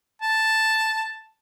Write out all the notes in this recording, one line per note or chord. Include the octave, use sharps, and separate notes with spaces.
A5